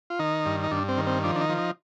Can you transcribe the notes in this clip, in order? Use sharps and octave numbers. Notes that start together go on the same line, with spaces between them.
F4
D#3 D#4
G2
D#4
G2 D4
C4
D#3
C4
F3 D4
D4
D#4
F3
D#4